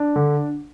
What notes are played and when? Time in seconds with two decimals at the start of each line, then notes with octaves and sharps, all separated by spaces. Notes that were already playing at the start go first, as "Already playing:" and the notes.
Already playing: D4
0.16 D3